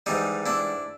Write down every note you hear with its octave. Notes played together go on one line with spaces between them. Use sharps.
G#2 E3 G3 D#4
D4 E4